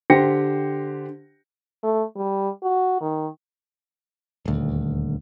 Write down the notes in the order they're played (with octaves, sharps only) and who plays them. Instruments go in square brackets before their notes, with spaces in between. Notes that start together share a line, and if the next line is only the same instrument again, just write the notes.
[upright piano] D3 G4 C5 G5 A#6 C#7
[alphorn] A3
G3
F#4
D#3
[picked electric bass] D#1 D2